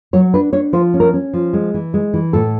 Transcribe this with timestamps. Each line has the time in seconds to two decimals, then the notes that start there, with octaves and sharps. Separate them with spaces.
0.13 F#3 C#5
0.34 D4 B4
0.53 D4 C#5
0.73 F3 C5
0.94 C#4
1.00 A#4
1.13 C#4
1.33 F3
1.53 G#3
1.74 E3
1.94 G#3
2.14 E3
2.33 A2 A4